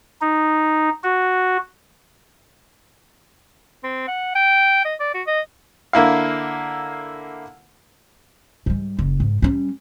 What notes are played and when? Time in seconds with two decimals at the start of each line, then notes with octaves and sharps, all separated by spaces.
0.21 D#4
1.03 F#4
3.83 C4
4.08 F#5
4.35 G5
4.85 D#5
5.00 D5
5.14 F#4
5.27 D#5
5.93 D3 A#3 E4 F5
8.66 G#2 G3
8.99 F#1
9.20 G#2
9.42 G3 C#4